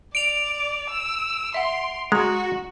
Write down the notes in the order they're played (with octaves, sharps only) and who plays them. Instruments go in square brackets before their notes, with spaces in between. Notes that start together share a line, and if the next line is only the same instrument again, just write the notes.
[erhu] D5 [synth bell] D7 F7
[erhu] E6
[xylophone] E5 F#5 [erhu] C6
[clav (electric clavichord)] G#3 [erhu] F#4 [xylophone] A#5